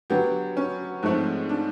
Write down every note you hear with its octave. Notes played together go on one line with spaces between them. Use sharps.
D3 F#3 B3 G4
C#4
G#2 F3 A3 C4
D4